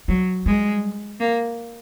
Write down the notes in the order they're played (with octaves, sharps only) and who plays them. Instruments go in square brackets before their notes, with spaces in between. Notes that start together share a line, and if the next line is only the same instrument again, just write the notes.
[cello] F#3 [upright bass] G3
[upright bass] G3 [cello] G#3
[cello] A#3